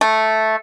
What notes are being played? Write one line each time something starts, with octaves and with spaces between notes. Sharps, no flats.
A3